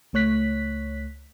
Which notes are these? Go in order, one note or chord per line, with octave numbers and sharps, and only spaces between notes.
C#2 A3 C#5 F#6 B6